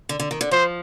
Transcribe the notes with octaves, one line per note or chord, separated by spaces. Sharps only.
D3
D3
D#3
D3
F3 C5